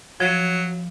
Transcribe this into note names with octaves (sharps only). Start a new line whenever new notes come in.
F3 F#3